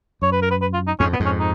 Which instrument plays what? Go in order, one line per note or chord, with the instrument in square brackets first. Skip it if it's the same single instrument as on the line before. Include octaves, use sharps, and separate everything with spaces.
[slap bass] F#2 [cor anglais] C#5
[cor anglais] B4
A#4
B4
B4
F4
D#4
[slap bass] F2 G#2 [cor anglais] C#4
[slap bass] A#2 [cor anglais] B3
[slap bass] F2 G#2
[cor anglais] C#4
D#4